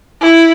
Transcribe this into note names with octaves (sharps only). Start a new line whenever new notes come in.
E4